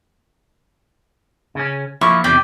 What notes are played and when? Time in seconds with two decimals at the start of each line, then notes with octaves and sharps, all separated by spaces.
1.55 C#3 C#4
2.01 F3 A#3 E4 C#6
2.24 E2 C3 D5 G5